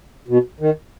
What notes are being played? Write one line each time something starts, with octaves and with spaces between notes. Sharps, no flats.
B2
D#3